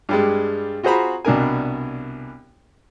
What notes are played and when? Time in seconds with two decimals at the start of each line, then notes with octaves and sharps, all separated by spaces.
0.09 G2 G3 G#3
0.83 F4 F#4 G#4 C5 A#5 B5
1.25 C2 B2 D4 A#4 G#5